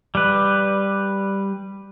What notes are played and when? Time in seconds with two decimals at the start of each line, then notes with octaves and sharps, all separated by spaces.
0.15 G3 B4